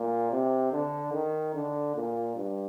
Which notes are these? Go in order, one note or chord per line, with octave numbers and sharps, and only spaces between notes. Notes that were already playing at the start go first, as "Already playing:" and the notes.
Already playing: A#2
C3
D3
D#3
D3
A#2
G2